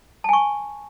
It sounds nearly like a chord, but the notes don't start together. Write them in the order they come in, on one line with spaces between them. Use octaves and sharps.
A5 G#5 C#6